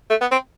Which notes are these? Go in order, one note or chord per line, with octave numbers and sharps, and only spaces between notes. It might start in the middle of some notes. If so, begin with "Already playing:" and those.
A3
B3
C4